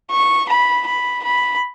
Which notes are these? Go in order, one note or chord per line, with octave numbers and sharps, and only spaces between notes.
C#6
B5
B5
B5